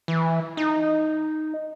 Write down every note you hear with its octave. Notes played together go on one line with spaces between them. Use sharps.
E3
D#4